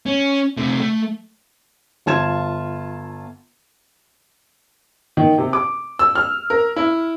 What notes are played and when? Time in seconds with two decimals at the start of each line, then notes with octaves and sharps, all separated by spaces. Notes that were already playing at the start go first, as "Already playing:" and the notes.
0.06 C#4
0.57 C3 A3
0.79 A3
2.06 G1 F4 A5 G#6 E7
5.17 D#3
5.38 C3
5.53 D6
5.99 E6
6.15 F6
6.50 A#4
6.76 E4